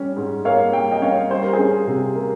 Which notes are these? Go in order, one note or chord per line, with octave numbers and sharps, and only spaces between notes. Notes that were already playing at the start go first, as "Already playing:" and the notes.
Already playing: G3 C#4
G#2
A#3 C#5 F5
G3 G5
D#5 G5
C#4 C#5 F5
G3 C5
A#4
G#4 C5
C#4
C3
A#3